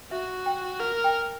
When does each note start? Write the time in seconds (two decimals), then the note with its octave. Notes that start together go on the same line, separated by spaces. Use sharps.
0.11 F#4 E5
0.46 G5
0.80 A#4 F#5
1.04 G5